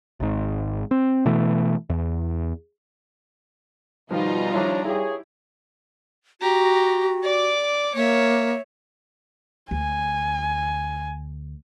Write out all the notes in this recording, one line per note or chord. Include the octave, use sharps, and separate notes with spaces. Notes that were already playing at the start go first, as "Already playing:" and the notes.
G#1 G#2
C4
B2 E3 A3
E2
B2 D#3 F3 G3 D#4 F4 A#5
D#3 F3 D4 E4 C#5
G2 E4 G4 G#4 C#5
F#4 G4 A#5
D5 D6
A#3 C#5 E5
D2 G#5